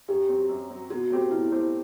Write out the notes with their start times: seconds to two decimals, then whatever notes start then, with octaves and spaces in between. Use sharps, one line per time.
0.08 F#2 G4
0.29 F#3 C4
0.49 F#2
0.70 F#3 C4
0.90 B2 F#4
1.10 A3 C4 G4 C5
1.31 B2 E4
1.51 A3 C4 G4 C5